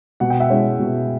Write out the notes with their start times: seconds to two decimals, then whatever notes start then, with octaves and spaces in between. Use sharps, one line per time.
0.20 B2 F#5
0.30 G5
0.40 E5 F#5
0.50 G#3 C#4 E4
0.80 B2